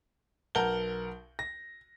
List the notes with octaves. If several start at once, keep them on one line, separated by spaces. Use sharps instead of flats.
B1 A#4 F#5 A5 G6 G7
A#6